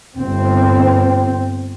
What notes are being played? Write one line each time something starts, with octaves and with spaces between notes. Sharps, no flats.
G1 C4